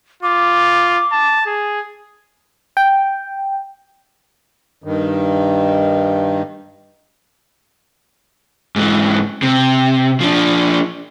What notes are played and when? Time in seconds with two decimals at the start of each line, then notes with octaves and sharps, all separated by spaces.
0.23 F4 D6
1.12 A5
1.46 G#4
2.77 G5
4.84 G2 D#3
8.76 G#2 E3
9.42 C3
10.20 F3 D4